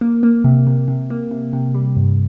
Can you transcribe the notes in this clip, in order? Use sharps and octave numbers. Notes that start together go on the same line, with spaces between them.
A#3
A#3
C3
C3
C3
A#3
C3
C3
G3
G2